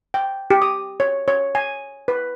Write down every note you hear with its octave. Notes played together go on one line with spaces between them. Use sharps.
G5
G4
D#6
C#5
C#5
G#5
B4